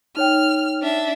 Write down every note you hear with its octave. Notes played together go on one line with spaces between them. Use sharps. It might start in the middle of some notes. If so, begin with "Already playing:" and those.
D#4 C#5 G5 F6
D4 E5